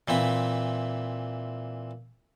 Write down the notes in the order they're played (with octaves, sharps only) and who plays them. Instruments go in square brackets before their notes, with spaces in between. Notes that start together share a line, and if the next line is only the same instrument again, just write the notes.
[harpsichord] A#2 E3 C4 B5